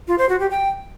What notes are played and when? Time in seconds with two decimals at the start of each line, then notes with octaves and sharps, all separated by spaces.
0.08 F4
0.18 C5
0.29 F#4
0.40 G4
0.51 G5